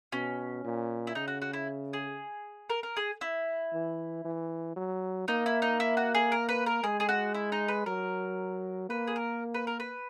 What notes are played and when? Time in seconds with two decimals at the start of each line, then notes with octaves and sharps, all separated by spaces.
0.12 B2 C#4
0.64 A#2
1.07 E4
1.15 C#3 D#4
1.28 F#4
1.42 F#4
1.53 E4
1.93 G#4
2.70 A#4
2.83 A#4
2.97 G#4
3.21 E4
3.74 E3
4.25 E3
4.76 F#3
5.28 A#3 D#4
5.46 E4
5.62 D#4
5.80 E4
5.97 F#4
6.15 G#4
6.32 A#4
6.49 B4
6.66 A#4
6.83 G#3 G#4
7.00 G#4
7.09 F#4
7.34 E4
7.52 D#4
7.68 B4
7.86 F#3 A#4
8.89 A#3 B4
9.07 G#4
9.16 A#4
9.54 B4
9.67 A#4
9.80 B4